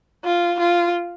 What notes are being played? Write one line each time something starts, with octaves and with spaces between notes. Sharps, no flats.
F4
F4